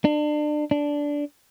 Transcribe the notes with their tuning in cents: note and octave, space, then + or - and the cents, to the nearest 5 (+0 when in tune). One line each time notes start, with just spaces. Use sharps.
D4 +30
D4 -10